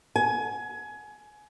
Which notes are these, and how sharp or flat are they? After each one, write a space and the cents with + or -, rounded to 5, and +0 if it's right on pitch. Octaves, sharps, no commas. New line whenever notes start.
G#5 +20